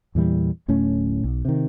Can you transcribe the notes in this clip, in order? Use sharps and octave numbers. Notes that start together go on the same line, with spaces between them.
E2 A#2 E3 G3
D1 A2 A3 C#4
B1
C3 D#3